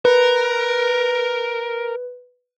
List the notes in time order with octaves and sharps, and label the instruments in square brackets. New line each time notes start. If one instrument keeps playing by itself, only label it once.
[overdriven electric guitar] A#4 [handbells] B4